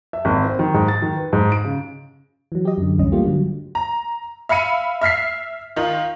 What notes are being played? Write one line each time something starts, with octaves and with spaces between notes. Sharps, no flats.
E5
G#1
C4
D#3
G#2
A6
D#3
B4
G#2
D7
C#3
E3 F#3
G4 D#5
F#2 D3
B1 E2 G2 C#4 D#5
G3 A3 A#3 F4 G4
G2 D3 F#3
A#5
E5 F5 B5 C#7 D#7
E5 F6 B6 C7
D#3 D#4 F4